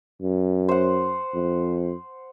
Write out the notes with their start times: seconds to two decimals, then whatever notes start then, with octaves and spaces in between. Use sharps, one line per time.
0.22 F#2
0.69 C5 F#5
1.34 F2